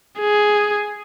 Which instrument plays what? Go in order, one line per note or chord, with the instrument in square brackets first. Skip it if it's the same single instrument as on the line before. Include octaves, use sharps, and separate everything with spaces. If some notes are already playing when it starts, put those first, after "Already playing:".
[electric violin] G#4